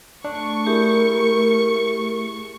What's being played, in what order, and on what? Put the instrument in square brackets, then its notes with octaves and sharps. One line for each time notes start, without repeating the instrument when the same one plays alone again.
[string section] A3 C#6 [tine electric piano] D4
[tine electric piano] E4 G#4 [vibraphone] G4 [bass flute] A#4